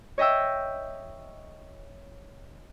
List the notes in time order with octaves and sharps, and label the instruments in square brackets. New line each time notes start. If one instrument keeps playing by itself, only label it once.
[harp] C#5 D#5 E5 G5 E6